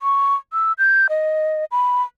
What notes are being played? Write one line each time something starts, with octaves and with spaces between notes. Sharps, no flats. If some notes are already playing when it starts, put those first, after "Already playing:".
C#6
E6
G6
D#5
B5